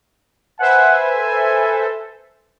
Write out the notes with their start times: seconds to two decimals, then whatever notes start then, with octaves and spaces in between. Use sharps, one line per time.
0.60 B4 C5 E5 F#5 G#5
1.14 A4